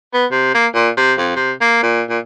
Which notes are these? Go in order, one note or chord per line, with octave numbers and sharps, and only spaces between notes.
B3
C3
A#3
A#2
C3
F2
C3
A#3
A#2
A#2